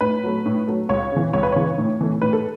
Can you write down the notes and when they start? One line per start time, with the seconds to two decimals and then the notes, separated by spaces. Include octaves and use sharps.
0.01 A2 B4
0.24 F#3 A3
0.46 A2
0.68 F#3 A3
0.89 C#2 C#5
1.12 C#3 E3
1.33 C#2 C#5
1.43 B4
1.52 C#3 E3 C#5
1.78 A2
2.01 E3 A3
2.22 A2 B4
2.33 A4